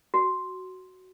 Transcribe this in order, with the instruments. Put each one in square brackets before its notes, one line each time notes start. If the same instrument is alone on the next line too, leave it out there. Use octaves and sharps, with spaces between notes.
[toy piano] F#4